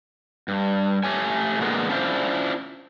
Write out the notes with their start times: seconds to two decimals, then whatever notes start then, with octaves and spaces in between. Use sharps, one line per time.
0.48 G2
1.04 A3 G4 C#5 G#5
1.59 A#2 D3 G#3 B3
1.89 C#4 D4 E4 F4 C5 D5